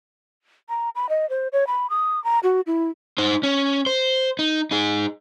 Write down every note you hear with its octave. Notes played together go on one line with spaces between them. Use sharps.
A#5
B5
D#5
C5
C#5
B5
D#6
A#5
F#4
E4
D#4 C5
C#4
C5
D#4
D#4 G#4